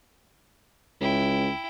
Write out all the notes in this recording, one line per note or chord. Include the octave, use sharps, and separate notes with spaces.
C#2 E4 G5